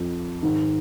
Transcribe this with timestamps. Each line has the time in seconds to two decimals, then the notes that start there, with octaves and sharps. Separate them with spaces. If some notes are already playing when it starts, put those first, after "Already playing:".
Already playing: F2 F3
0.43 G#2 D#3